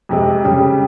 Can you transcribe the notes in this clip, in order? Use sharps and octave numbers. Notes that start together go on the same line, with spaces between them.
F2 C3 G#3
F2 C#3 G3